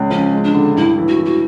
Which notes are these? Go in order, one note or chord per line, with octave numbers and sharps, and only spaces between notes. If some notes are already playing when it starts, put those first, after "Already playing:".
Already playing: C#2
F3 C#4
G#3
D4
D3
G2 E4
E3
F#4
E3
F#4